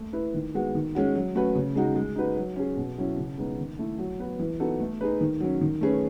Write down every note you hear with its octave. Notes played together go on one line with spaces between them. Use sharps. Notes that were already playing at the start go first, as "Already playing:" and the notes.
Already playing: A3
E4 B4
D#3
G#3 B3 F#4
D#3
G#3 C#4 F#4
F#3
A3 C#4 F#4 B4
C#3
G#3 D#4 F#4
G#3
D#4 F#4 B4
F#3
C#4 G#4
B2
F#3 C#4 E4
C#3
G#3 B3 D#4
D#3
A3 E4
F#3
B3 F#4 B4
E3
B3 D#4 F#4 A4
A3
D#4 G#4 B4
D#3
F#3 C#4
D#3
A3 C#4 G#4 B4